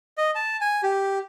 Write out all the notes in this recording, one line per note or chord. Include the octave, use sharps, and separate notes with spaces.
D#5
A5
G#5
G4